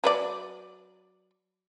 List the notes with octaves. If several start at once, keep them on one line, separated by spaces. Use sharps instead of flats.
F#3 B4 D5